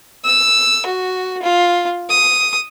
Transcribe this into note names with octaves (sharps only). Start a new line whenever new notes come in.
E6
F#4
F4
D#6